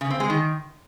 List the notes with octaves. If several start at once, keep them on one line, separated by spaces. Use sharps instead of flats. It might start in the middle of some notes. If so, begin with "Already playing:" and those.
C#3
C4
G#3
D#3